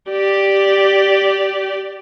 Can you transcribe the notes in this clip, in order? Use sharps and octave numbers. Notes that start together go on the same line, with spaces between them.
G4 D5